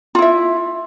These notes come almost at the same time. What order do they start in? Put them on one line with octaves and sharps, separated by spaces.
F4 E4 E5